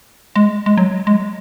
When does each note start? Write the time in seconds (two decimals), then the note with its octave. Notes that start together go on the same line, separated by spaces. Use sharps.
0.36 G#3
0.66 G#3
0.77 F#3
1.07 G#3